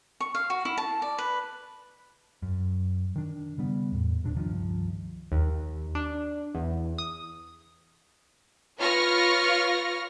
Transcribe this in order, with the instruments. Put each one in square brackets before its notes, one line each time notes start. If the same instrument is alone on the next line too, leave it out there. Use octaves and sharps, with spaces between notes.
[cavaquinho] C#6
F5
F#4
E4
A5
D5
B4
[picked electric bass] F#2
D#3 D4
C#3 G3 B3
E2 A2
D1 D#2 C3 D4
C#2 G2 D#3 F3
[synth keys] D#2
D4
E2
D#6
[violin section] F4 B4 C#5 C#6 F6 A#6